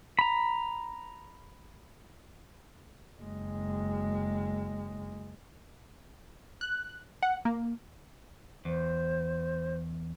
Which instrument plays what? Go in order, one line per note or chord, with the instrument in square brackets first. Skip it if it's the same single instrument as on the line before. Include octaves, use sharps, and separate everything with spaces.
[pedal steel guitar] A#5 B5
[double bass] F#1 G#3
[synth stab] F#6
F#5
A#3
[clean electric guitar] E2 [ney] C5